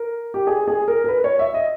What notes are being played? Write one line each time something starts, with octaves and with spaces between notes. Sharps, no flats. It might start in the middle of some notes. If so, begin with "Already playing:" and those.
Already playing: A#4
G4
G#4
G#4
A#4
A#4
B4
C#5
E5
D#5